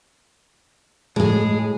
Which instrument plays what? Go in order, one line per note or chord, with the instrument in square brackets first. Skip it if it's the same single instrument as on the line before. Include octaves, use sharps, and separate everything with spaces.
[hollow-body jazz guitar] A2 [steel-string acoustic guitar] G#3 G#4